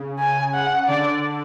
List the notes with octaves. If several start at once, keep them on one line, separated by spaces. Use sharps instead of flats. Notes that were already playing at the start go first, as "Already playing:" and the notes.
Already playing: C#3
G#5
F#5
D3 D5